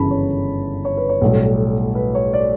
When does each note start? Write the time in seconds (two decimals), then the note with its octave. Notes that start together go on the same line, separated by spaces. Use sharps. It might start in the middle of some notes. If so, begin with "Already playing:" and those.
Already playing: G1 F#2 C#3 E3 A5 B5
0.11 C#5
0.85 C#5
0.97 B4
1.09 C#5
1.21 B1 A2 G3
1.95 B4
2.15 C#5
2.33 D5